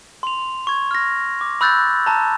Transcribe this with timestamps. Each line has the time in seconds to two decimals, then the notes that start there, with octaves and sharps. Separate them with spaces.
0.23 C6 F7
0.67 C#6 G#6
0.91 F6 A#6
1.41 D6
1.61 B5 E6 F#6 G6 A6
2.06 A5 A#5